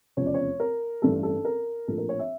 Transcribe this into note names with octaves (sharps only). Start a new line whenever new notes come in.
F1 E2 C#3 F3 C#5
D5
C#5
A#4
A1 G2 E3 A4
A4
A#4
A#1 A2 F3 A4
A#4
C#5
E5